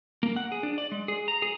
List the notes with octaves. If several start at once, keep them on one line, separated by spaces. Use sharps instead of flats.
A#3
F#5
G#4
D4
D5
G#3
G#4
A#5
G#4